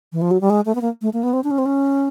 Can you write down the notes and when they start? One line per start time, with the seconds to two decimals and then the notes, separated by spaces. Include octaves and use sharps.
0.13 E3
0.21 F3
0.31 F#3
0.41 G3
0.50 G#3
0.65 A3
0.75 B3
0.81 A#3
1.02 A3
1.13 A#3
1.23 B3
1.33 C4
1.44 D4
1.51 C#4
1.58 C4
1.66 C#4